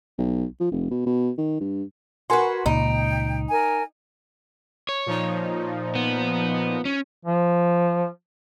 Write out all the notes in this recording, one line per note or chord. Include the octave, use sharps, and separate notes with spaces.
B1
F3
F1
B2
B2
D#3
G2
F#4 A#4 B4 G#5 C6
C#2 A#2 D#4 G5
A#4 G#5
C#5
A#2 F3 D#4
B3
C#4
F3